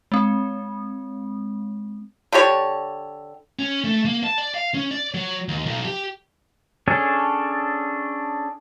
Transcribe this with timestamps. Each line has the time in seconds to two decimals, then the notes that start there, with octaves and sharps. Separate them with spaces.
0.12 G#3 C4
2.32 D3 D4 G4 C#5
3.59 C#4
3.84 A3
4.05 A#3
4.24 A5
4.38 D5
4.54 F5
4.74 C#4
4.91 D5
5.14 F#3
5.48 D#2
5.66 B1
5.85 G4
6.88 C#4 D4 G#4 A4 C#5